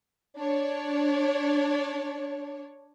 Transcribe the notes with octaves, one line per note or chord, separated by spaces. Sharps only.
D4 C#5